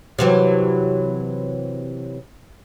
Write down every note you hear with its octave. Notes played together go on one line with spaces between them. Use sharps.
C3 E3 F#3